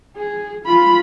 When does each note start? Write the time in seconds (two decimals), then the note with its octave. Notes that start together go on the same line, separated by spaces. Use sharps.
0.16 G#4
0.65 F4 B5